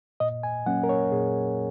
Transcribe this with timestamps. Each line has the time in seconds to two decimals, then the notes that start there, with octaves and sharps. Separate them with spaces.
0.20 A#2 D#5
0.43 G#5
0.66 F#3 A#3 C#4 F#5
0.83 A#4
0.89 C#5
1.12 A#2 G#4